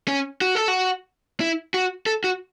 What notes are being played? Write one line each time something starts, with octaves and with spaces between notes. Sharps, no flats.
C#4
F#4
A4
F#4
E4
F#4
A4
F#4